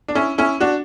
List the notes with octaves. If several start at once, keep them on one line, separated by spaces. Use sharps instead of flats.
D4
C#4 E4
C#4 E4
D4 F#4